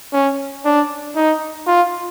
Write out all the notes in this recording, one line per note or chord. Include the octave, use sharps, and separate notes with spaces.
C#4
D4
D#4
F4